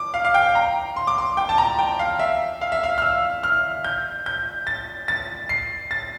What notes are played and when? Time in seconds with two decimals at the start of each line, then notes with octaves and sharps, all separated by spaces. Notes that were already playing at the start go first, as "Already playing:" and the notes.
Already playing: D6
0.14 F5
0.25 F5
0.34 G5
0.55 A#5
0.96 C6
1.07 D6
1.18 C6
1.37 G5
1.49 A5
1.58 A#5
1.79 G5
1.99 F5
2.19 E5
2.61 F5
2.72 E5
2.83 F5
2.98 F6
3.02 E6
3.43 F6
3.84 G6
4.26 G6
4.67 A6
5.08 A6
5.49 C7
5.91 A6